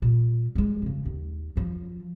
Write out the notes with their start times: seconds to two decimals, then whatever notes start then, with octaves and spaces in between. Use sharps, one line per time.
0.02 A#2 G3
0.55 G3 G#3
0.82 F2 C#3
1.05 D#2
1.56 F#2 F3